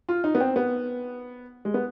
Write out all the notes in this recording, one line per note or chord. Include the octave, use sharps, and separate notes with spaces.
F4
D#4
B3
C4
B3
G#3
B3